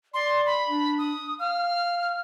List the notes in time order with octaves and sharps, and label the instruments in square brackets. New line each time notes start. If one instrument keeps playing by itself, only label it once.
[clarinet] D5 [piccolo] C6
[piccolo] B5
[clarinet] D4
[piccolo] D#6
[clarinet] F5 [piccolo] F6